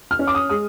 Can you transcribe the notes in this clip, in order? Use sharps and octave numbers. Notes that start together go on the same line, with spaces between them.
F6
C#4
D6
D#6
G#3 D#6